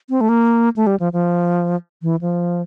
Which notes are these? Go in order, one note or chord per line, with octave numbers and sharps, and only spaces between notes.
C4
A3
A#3
A3
G3
F3
F3
E3
F3